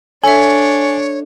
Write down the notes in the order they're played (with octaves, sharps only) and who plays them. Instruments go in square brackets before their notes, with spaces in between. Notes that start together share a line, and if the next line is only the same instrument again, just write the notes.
[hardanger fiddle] D4 [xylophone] A4 E5 [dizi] C#5 [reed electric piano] G#5